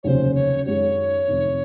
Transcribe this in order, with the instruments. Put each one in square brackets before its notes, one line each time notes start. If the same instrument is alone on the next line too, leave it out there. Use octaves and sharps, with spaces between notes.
[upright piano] F1 D#2 C#3 F#3 C#4 [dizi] C5 C#5
[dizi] C#5
[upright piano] F#2 D#3 G#3 C#4 F#4 [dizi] C#5
[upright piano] F1 F2 D#3